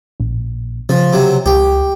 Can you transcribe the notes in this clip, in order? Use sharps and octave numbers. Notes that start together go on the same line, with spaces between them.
A#1
C#3 F3
C3 F#3
C#2 G4